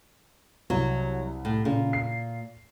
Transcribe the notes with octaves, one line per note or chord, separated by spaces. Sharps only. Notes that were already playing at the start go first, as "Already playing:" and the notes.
C2 F#3
A2
A#2 C#3
C7